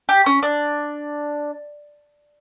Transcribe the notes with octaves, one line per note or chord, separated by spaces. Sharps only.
G4
C#4
D4